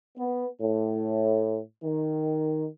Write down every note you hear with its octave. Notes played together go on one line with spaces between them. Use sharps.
B3
A2
D#3